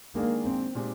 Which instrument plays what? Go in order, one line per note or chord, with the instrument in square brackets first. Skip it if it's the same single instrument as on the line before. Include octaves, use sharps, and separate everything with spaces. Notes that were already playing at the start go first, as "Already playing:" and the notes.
[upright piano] D#3 G#3 D4 G#4 [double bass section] A#3
[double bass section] C4
[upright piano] A#2 G#3 C4 D#4 G4